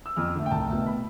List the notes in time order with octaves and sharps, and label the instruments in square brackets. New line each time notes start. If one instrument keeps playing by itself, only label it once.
[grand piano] E6
F2 F6
D3 A3
G5
C2 A5
B2 A3
B5